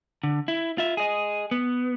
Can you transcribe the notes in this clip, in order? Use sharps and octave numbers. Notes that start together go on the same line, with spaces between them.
D3
E4
F4 E5
G#4 D#5
B3